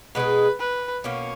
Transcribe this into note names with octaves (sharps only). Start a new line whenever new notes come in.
B2 G#3 D#4 G#4 B4
B4
B2 A#3 C#4 C#5